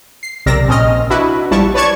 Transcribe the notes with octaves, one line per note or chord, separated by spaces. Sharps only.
C7
B1 C3 A#4 D5 E6 A#6
A#1 C4 C#4 D#5 F6
D4 E4 F#4 B4
A#1 F3 G3 E4 A5 C#6
B4 C#5 D5 A5 C#6 G#6